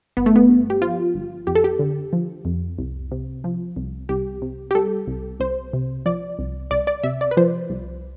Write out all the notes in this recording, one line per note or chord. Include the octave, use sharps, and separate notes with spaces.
G1 B3
A3
B3
G2
G4
F3 F4
G1
F2 G4
A4
G4
D3
F3
F2
C2
C3
F3
C2
C2 G4
C3
G4
G3 A4
C2
C2 C5
C3
F3 D5
C2
C2 D5
D5
C3 E5
D5
B4
F3 C5
C2